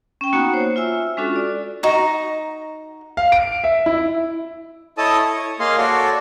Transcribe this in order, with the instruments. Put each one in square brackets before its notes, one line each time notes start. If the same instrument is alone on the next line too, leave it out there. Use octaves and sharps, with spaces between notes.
[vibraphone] C#4 G5
A#3 B3 D#4 F#4 F#5
C5 C#5
F4 E5 G#5 E6
G#3 C#4 D4 F4 F#4 A4
D5
[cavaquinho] D#4 F#4 A#5
[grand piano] F5
D7
E5
E4
[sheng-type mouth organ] E4 A4 C#5 D#5 A5 D#6
C#5
A#3 G#4 D#5 F5 C6
F#4 A4 C#5 D5